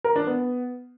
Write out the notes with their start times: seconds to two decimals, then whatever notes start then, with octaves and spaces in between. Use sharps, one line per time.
0.04 A#4
0.16 D4
0.27 B3